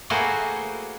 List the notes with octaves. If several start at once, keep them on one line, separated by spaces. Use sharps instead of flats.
A3 A#3 E4 F#4 G#4 C5